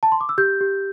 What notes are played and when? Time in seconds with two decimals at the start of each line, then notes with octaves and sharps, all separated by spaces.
0.03 A5
0.12 C6
0.21 D6
0.29 E6
0.38 G4 G6
0.61 G4